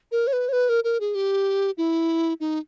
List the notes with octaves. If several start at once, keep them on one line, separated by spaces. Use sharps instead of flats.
A#4
C#5
B4
C#5
B4
A#4
A#4
G#4
G4
E4
D#4